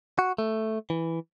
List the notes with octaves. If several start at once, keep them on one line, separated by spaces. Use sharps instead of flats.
F#4
A3
E3